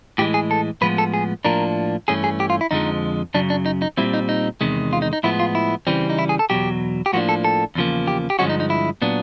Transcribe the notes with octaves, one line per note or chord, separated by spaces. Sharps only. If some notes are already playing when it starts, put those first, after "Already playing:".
A2 E3 G#3 G4
G#4
A4
A2 F3 G#3 B3 B4
A4
G#4
A2 F3 A#3 D4 A#4
G2 E3 A3 C#4 G#4
G#4
G4
F4
E4
F2 D3 F3 G#3 D#4
F#2 C#3 F#3 D4
D4
D#4
D#4
A#2 G3 C4 E4
D#4
D#4
E2 C3 D#3 G#3
F4
D#4
D#4
A2 F3 G#3 B3 E4
F4
E4
C#3 E3 G3 C4
D#4
E4
G#4
A4
E2 B2 F#3 G4
G4
A2 F3 A#3 D4 F#4
A4
A4
E2 C#3 F3 A#3
G4
G4
G2 D3 F3 G#3 C#4 F#4
D#4
D#4
E4
A#2 F#3 B3 D4